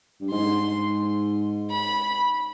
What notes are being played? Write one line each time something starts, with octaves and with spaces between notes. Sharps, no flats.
G2
G#2 C6
B5